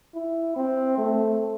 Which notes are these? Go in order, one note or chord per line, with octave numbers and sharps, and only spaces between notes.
E4
C4
A3